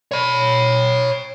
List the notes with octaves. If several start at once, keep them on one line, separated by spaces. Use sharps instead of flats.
C#5 B5